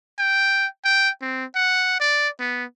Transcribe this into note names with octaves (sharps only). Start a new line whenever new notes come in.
G5
G5
C4
F#5
D5
B3